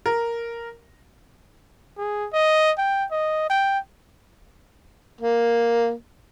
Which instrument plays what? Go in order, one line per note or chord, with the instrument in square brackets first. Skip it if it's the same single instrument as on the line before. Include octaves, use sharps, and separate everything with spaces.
[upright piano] A#4
[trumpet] G#4
D#5
G5
D#5
G5
[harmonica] A#3